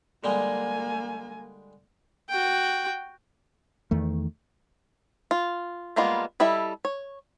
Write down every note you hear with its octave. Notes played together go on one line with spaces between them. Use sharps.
D3 G3 G#3 A#3 G#5
F#4 G5
E2 D#3 A3
F4
G3 G#3 A#3 B3 F4
G3 E4 A4 D#5 E5
C#5